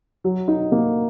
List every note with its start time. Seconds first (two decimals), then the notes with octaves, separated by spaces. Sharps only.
0.24 F#3
0.48 D#4
0.72 A#3